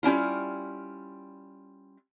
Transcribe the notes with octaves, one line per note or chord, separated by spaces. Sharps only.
G3 C#4 E4 F4